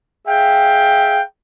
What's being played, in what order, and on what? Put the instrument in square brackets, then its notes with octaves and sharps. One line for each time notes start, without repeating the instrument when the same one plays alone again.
[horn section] G#4 E5 F5 G5